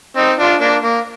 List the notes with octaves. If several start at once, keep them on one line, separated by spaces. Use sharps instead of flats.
C4 D#4
D4 F4
A#3 D4
A#3